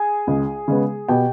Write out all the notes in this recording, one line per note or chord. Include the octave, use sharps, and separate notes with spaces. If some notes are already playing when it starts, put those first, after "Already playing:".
Already playing: G#4 G#5
C#2
C#3 G#3 B3
B2 G4 G5